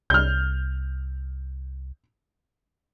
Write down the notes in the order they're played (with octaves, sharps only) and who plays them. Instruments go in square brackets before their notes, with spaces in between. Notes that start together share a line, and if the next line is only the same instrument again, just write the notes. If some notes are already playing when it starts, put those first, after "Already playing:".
[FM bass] C2 [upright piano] F6 G6